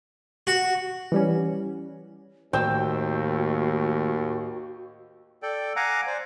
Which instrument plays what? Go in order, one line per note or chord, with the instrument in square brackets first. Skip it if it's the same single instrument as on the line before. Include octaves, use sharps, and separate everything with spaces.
[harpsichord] F#4
[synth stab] E3 G3 C#4
[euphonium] D#2 [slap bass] A2 D#3 A#3 [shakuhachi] F#4 [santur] G5 E6
[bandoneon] A4 D5 G5
F5 F#5 G#5 A#5 D6
C5 D5 G#5